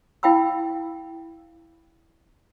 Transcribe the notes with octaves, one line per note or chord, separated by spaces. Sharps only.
E4 F5 G5 B5 E6